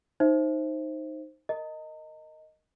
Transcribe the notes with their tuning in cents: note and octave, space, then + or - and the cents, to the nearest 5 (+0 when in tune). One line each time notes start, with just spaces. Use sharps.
D#4 +0 C5 +10 E5 +0
A#4 -10 D#5 +0 A#5 -40